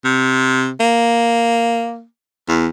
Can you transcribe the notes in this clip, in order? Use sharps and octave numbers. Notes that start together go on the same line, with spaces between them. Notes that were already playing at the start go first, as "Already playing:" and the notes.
C3
A#3
E2